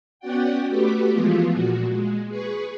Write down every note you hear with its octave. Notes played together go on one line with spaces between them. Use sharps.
B3 C#4 F#4 D5 F#5 G5
A3 F#4 G4 B4 D6 B6
E3 F3 G#3 A3 B3 F4
A#2 F#4
G#3
G#4 B4 C#6